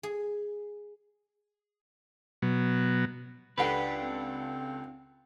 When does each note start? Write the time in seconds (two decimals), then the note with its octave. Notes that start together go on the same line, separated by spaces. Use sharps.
0.03 G#4
2.42 B2 F#3
3.58 C#2 D4 G4 A4 B4 F#5 B5
4.02 C4